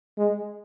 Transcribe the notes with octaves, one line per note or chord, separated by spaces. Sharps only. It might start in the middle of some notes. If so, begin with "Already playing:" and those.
G#3